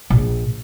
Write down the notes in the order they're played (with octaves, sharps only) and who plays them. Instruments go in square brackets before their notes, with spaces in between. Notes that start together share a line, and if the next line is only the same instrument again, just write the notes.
[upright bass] A#1